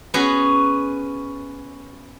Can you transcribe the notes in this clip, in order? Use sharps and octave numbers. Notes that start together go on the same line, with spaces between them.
B3 C#4 F#4 G#4